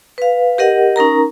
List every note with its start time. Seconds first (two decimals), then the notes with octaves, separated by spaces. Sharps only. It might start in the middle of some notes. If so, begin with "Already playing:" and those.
0.18 B4 F5
0.58 G4 A#4 D#5 F#5
0.96 C#4 D#4 A#4 A#5